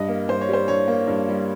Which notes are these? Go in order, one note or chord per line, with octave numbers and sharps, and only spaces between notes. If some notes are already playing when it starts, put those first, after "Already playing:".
Already playing: G2 D#5
A#3
G2 C5
C#5
G3 C5
G2 C#5
A#3
G2
G3